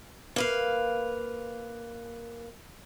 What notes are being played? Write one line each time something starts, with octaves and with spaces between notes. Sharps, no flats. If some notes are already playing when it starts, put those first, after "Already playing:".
A#3 B4 F5